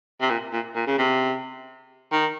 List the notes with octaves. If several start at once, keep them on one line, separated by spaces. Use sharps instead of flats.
C3
A#2
A#2
A#2
C#3
C3
D#3